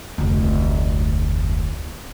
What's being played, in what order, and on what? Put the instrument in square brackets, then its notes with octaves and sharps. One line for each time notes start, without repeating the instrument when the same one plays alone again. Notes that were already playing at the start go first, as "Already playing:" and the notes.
[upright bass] F1 D2